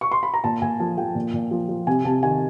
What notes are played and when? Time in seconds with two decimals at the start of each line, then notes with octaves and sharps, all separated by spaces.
0.01 C#6
0.12 C6
0.23 B5
0.34 A#5
0.44 A#2 A5
0.62 A#2 G#5
0.80 F3 A5
0.98 F3 G5
1.15 A#2
1.34 A#2
1.51 F3
1.69 F3
1.87 C3 G#5
2.05 C3 A5
2.23 D#3 G#5